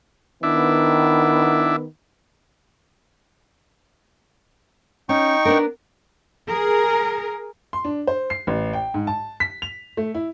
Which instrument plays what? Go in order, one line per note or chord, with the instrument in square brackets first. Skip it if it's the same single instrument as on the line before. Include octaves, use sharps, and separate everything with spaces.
[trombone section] D#3 B3 [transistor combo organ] D4 E4
[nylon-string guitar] C#4 [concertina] D#4 G5 C#6
[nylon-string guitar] B3 D4 A#4
[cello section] G#4 A#4
[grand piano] C6
D4
C5
C7
A1
G5
G#2
A5
B6
F7
A3
E4